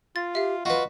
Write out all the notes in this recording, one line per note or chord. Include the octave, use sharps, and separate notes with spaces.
F4 A6
G4 E5 F5
F4 F#4 B4 D#5